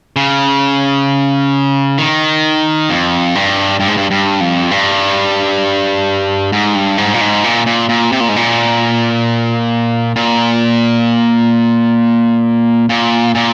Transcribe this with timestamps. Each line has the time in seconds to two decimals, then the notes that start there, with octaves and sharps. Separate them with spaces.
0.16 C#3
1.98 D#3
2.90 F2
3.35 G2
3.80 G2
3.88 G#2
3.97 G2
4.11 G2
4.41 F2
4.71 G2
6.52 G#2
6.75 G2
6.98 G#2
7.14 A#2
7.21 G#2
7.44 A#2
7.66 A#2
7.89 A#2
8.12 C3
8.20 A#2
8.29 G#2
8.36 A#2
10.16 A#2
12.89 A#2
13.35 A#2